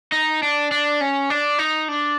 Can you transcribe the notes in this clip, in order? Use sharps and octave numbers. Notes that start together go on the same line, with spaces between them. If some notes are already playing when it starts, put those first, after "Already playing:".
D#4
D4
D4
C#4
D4
D#4
D4